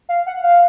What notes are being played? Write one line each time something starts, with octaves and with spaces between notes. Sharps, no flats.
F5
F#5
F5